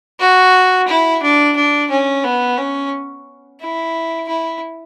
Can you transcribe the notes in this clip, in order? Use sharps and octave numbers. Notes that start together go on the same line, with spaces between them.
F#4
E4
D4
D4
C#4
B3
C#4
E4
E4